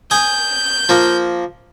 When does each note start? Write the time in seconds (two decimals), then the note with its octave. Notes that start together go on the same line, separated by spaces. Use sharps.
0.11 G#5 D#6 G6
0.89 F3 A#3